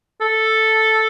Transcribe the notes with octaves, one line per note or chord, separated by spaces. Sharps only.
A4